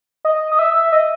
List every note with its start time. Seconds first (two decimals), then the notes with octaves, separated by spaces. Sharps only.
0.25 D#5
0.52 D#5
0.59 E5
0.92 D#5